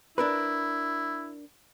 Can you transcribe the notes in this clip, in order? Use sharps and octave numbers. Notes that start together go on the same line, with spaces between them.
D4 E4 A#4 B4